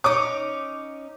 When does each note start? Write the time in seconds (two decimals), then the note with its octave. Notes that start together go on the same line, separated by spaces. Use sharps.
0.04 C#4 D#4 D6